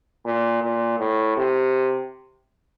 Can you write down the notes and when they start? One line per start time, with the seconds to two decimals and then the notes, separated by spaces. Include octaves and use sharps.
0.26 A#2
0.63 A#2
0.99 A2
1.37 C3